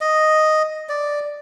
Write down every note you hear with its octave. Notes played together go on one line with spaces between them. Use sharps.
D#5
D5